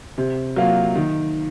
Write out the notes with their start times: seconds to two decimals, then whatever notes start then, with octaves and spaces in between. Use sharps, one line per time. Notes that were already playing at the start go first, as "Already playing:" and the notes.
0.18 C3
0.56 F#3 A#3 F4
0.96 D#3